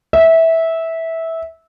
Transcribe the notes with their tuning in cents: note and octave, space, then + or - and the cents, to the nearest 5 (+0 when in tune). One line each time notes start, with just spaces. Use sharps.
E5 -15